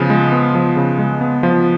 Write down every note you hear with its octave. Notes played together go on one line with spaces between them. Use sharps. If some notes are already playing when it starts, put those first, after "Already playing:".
Already playing: C#3 F3 B3
G#3
B3
F3
C#3
G#3
B3
F3